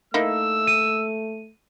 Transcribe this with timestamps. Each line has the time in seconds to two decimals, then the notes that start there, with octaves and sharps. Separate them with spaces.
0.14 A3 A#3 D#4 E4 E6
0.67 D#7